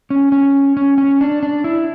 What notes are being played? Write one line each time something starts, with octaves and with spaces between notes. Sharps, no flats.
C#4
C#4
C#4
C#4
D4
D4
E4